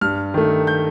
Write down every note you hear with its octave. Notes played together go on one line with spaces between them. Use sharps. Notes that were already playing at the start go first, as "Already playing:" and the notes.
G2 F6
D#3 A3
G6